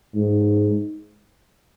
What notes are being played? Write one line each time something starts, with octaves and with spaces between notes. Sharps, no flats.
G#2